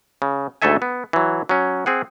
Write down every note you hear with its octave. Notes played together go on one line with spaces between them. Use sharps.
C#3
D2 G#2 A3 A4 E5 G#5
B3
E3 F#3
F#3 C#4
C4 G#4 F#5